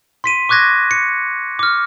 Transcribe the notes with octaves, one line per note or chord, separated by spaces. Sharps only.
C6 B6 D#7
C#6 D6 F#6 G#6 A#6
C#7
D6 F6